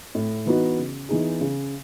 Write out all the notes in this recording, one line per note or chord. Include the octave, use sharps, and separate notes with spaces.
A2
E3 B3 D#4 F#4
C#3
E3 B3 D#4 G#4
C#3